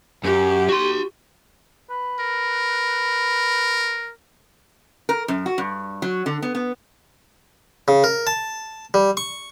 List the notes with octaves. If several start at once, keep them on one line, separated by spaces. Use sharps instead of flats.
F#2 G4
F#4 C6
B4
A#4
A#4
F#2
F#4
G2
F#3
D3
B3
B3
C#3
A#4
A5
G3
C#6